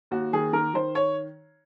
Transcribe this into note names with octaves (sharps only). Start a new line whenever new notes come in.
D#2 F#4
D#3 G#4
D#3 A#4
D#3 C5
C#5